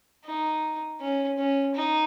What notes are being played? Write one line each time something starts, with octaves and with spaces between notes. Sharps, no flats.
D#4
C#4
C#4
D#4